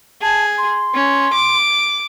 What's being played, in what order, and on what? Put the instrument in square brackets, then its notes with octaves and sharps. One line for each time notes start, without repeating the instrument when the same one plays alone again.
[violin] G#4 [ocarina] A5
[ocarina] C6
[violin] C#4
D6